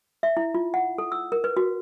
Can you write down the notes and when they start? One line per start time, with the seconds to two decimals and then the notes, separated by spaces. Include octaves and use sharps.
0.23 E5
0.37 E4
0.55 F4
0.74 F#5
0.98 A4
1.12 E6
1.32 A#4
1.44 B4
1.57 F#4